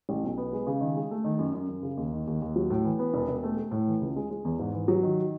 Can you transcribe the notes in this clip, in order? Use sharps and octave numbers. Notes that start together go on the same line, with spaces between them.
A1
B1
B3
G#3
C#3
D#3
G#3
A3
D#3
F#2
F#2
F#2
C#3
D#2
D#3
D#2
D#2
F#3
A2
E3
B3
E1
E1
A3
A3
A2
E3
C#2
G#3
G#3
E2
G#2
E3
F#3
D#3